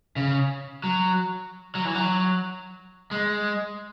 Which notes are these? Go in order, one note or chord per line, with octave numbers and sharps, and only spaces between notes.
C#3
F#3
F#3
E3
F#3
G#3